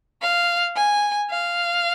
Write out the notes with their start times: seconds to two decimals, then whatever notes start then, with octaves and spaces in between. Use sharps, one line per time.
0.21 F5
0.76 G#5
1.30 F5